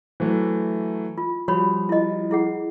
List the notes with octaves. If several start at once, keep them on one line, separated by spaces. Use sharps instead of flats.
E3 F#3 A3 C5
F4
F3 G3 F#4 C#5 B5
E4 D#5
E4 G#4 F#5